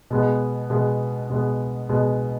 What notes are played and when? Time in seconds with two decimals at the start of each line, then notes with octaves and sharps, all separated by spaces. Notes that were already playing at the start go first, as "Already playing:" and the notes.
0.10 B2 G#3 B3
0.70 B2 G#3 B3
1.30 B2 G#3 B3
1.89 B2 G#3 B3